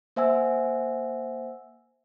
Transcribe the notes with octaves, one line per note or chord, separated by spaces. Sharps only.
A#3 C5 E5 F#5 G#5 E6